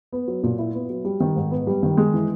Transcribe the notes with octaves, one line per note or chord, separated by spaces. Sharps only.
B3
F#3
A#2
E4
B3
F#3
G3
D#3
G#2
B3
G3
D#3
G#3
E3